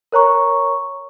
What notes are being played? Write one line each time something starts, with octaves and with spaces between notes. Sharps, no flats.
A#4 C#5 A#5 C#6